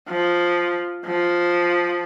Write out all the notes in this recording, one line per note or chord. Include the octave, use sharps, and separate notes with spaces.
F3
F3